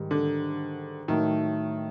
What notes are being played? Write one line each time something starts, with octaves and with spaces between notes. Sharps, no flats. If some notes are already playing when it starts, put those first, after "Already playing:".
Already playing: G#2 D#3 G3
D3
A2 D#3 F#3 A3